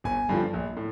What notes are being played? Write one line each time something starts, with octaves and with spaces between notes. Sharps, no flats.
G1 G#5
G2 D3 F3
A#1
A2